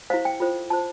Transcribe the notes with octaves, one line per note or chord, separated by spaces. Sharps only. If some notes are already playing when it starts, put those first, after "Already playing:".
E4 G4 C5 F5
G5
F4 A4 C5
F4 C5 A5